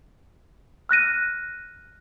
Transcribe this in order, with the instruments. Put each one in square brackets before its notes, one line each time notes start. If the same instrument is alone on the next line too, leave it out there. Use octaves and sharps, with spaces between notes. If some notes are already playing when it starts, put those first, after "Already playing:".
[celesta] F6 F#6 A#6 D#7